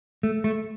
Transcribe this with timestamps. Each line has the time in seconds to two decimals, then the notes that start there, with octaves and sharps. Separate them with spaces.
0.23 A3
0.44 A3